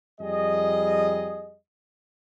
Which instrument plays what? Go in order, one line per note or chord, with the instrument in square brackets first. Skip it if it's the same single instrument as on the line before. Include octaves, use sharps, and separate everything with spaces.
[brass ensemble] F2 G3 G#4 D#5